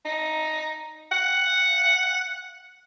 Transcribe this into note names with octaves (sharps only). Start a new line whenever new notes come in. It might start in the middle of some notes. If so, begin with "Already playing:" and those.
D#4
F#5